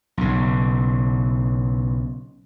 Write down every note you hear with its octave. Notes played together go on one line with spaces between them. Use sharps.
B1 C#3